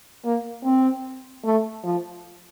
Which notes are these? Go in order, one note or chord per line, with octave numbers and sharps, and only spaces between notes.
A#3
C4
A3
F3